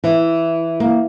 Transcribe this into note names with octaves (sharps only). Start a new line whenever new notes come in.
E3
A#3